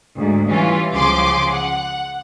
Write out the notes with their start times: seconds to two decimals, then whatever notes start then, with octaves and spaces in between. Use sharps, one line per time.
0.16 D2 G#2
0.50 E3 G3 C#4 F4
0.94 C#2 C#3 F3 G#4 C6 D6
1.51 F#5